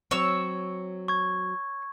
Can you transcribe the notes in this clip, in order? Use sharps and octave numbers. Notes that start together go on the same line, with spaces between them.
F#3 C4 C#5 E6
C#6 G#6